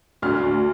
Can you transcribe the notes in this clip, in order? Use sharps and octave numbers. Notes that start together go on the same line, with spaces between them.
D2 F6
D2